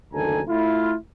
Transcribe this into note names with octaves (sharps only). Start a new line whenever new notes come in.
F#1 D2 D#3 A4 G#5 A#5
A3 E4 F4